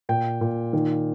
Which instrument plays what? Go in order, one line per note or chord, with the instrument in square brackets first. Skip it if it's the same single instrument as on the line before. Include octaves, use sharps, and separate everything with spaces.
[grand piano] A#2 G5
A#2
D#3